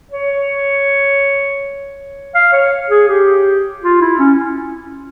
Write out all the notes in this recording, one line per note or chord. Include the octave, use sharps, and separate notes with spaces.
C#5
F5
C#5
G#4
G4
F4
E4
C#4